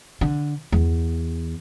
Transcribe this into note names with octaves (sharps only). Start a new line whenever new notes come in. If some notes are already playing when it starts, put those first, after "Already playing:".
D3
E2